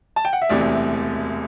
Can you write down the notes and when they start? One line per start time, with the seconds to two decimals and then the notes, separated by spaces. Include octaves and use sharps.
0.16 A5
0.25 G5
0.33 F#5
0.42 E5
0.49 E1 D2 C3 E3 D5